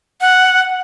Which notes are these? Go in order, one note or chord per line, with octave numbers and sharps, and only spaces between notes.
F#5